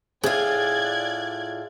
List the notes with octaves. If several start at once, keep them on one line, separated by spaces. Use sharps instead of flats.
A2 F4 G#4 D5 F#6 G#6